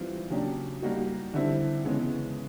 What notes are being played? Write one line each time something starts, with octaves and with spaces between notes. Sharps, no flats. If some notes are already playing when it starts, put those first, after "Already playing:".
Already playing: E3 G3 C4 F4
C#3 F#3 A#3 D4 G4
G3 A#3 D#4 F#4
D3 G3 C4 E4
C#3 E3 G#3 B3